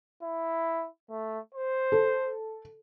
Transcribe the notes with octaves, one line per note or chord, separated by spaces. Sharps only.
E4
A3
C5
A4